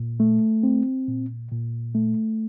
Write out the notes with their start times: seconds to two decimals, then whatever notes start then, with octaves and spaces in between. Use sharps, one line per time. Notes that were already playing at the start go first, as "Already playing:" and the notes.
Already playing: A#2
0.20 A3
0.63 C4
1.08 A#2
1.51 A#2
1.95 A3